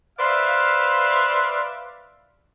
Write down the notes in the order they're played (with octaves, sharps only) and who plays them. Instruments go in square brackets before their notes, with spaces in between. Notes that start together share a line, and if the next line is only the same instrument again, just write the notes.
[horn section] B4 C5 D5 E5 F5